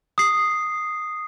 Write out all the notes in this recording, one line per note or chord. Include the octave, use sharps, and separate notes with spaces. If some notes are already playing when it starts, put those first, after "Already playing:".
D#6 C7